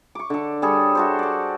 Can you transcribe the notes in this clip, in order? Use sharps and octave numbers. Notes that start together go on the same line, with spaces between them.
C#6 D6
D3 A4
G3 G#4 A4 C#5
F#4 A4 C5
A4 D5